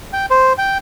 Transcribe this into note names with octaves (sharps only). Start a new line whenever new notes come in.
G5
C5
G5